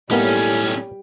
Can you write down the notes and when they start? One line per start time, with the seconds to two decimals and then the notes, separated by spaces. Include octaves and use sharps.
0.11 B1 A2 G3 A#3 B3 C#4 D#4